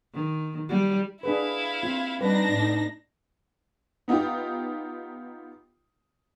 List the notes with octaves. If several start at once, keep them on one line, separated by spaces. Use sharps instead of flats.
D#3
G3
D4 E4 G#4 B4 F5
C4 F4
G3 D4 D#4 B4 A#6
A2 D#4
B3 D#4 F4 G4